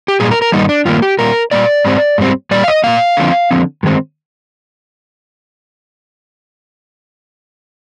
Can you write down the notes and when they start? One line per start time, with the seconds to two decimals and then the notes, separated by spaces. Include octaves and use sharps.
0.08 G4
0.20 A#2 G3 G#4
0.31 A#4
0.42 A#4
0.52 G2 D#3 G3 A#3 D#4
0.69 D4
0.85 G2 D#3 A#3 F4
1.02 G4
1.19 A#2 G3 A#3 A#4
1.51 A#2 G3 A#3 D5
1.85 G#2 G3 C4
2.18 G#2 G3 C4
2.51 A#2 G3 D5
2.64 F5
2.68 D#5
2.84 A#2 G3 A#3 F5
3.17 D3 F3 C4
3.51 D3 F3 C4
3.83 G2 D#3 G#3 C4